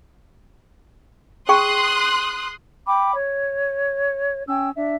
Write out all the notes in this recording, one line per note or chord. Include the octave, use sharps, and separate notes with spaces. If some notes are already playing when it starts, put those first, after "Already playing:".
G#4 G5 C6 C#6 D#6 F#6
G5 B5 D6
C#5
C#4 G5 E6
D4 E5